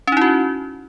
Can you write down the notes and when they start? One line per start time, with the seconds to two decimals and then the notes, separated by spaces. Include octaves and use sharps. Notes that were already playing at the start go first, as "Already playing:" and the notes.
0.07 C#4
0.12 D#4
0.17 E4
0.21 F#4